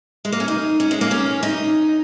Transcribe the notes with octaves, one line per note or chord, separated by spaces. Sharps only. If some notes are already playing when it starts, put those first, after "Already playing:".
G#3
A#3
C#4
D#4
C#4
G#3
A#3
C#4
D#4